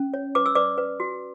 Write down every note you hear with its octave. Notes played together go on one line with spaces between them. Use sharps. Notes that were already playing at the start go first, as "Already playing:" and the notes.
Already playing: C#4
C#5
B4 D6
E6
B4 D5 D6
B4
F#4